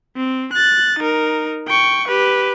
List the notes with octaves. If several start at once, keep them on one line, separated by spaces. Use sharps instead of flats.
C4
F#6 A6
D#4 A#4
G5 C#6
G4 B4